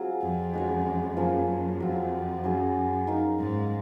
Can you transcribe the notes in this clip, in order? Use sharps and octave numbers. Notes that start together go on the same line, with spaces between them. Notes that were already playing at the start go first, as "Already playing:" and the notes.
Already playing: F#3 C4 F4 G#4
F2
G#3 C#4 F#4 C#5
F#2 F3 A#3 C#4 G#4
F2 F#3 C4 F4
F#2 F#3 C#4 G#4
D#4 A#4 F5
G#2